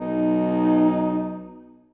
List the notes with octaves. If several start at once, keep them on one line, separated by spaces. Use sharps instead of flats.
B1 D#4